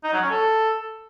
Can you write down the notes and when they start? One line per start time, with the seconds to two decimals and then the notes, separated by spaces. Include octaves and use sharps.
0.04 D#4
0.13 F#3
0.22 C#4
0.31 A4